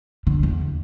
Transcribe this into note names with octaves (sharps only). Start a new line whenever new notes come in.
D3
E2